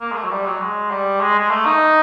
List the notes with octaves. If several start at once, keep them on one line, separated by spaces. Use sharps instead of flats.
A#3
G#3
A3
F#3
G3
F#3
G#3
G3
G#3
G#3
A3
D#4